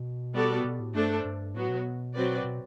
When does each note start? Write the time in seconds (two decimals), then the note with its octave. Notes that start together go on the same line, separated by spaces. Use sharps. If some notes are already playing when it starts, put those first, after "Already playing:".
Already playing: B2
0.34 G3 B3 F#4 A4 D5
0.64 B2
0.80 A2
0.95 G2 A3 D4 A4 C5
1.25 G2
1.55 A2 F#3 B3 F#4
1.69 B2
2.14 F#3 C4 F#4 B4 D5
2.44 B2